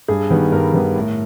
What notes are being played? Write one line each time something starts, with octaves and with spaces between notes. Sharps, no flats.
G2 G#4
D#3 G3 B3
G2 A#4
D#3 G3 B3
A2